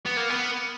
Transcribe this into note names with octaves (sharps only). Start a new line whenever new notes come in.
B3
A#3
B3